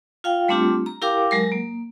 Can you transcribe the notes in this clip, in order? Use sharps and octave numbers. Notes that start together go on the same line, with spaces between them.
F4 F5 G5
G3 A3 C4 D4 F4 G4
A#5
E4 G4 A#4 F5 G5 D6
F#3 G#3 A#4
A#3